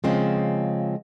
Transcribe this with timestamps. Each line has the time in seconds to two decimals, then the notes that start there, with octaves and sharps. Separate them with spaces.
0.04 C#3 F3 G#3 C4